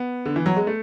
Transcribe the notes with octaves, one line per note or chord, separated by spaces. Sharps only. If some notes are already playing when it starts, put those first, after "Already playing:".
Already playing: B3
D3
E3
F#3
G#3
A3